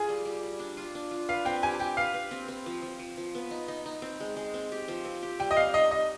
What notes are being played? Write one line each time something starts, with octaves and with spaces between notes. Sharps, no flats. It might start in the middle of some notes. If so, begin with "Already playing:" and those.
Already playing: F4 G#4
G3
G3
G3
D4
F4
D4
F4
B4 F5
C4 G5
G4 G#5
G4 G5
B4 F5
B4
C4
C4
F3
F3
F3
F3
B3
D#4
D#4
D#4
C4
G#3
G#3
C4
G4
F3
C4
G4
G3 G5
D#5
C4 F5
D#4 D#5
D#4 D#5